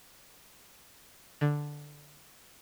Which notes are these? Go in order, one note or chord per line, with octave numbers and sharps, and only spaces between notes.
D3